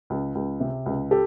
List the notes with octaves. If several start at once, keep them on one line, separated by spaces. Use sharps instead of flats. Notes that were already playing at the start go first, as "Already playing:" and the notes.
C#2
C#2
C3
C#2
G4 A4